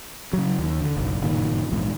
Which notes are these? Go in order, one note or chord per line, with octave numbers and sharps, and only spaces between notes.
C#3 F#3
D#2
D3
F#1 B1
F#1 G2 A#2 D#3
A#1 E2 G#2